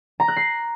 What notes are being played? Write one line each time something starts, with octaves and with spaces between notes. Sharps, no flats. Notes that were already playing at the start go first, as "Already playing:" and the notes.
A#5
F#6
C7